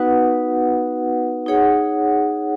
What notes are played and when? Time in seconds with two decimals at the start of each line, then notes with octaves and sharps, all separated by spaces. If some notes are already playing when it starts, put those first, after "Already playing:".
Already playing: B3 D#4 F#4 B4 F#5
1.46 D#4 G#4 C#5 F#5